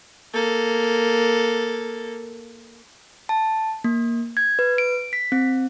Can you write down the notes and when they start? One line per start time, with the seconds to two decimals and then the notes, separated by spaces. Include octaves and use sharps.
0.34 A#3 A4
3.29 A5
3.84 A#3
4.37 G#6
4.59 B4
4.78 D7
5.13 B6
5.32 C4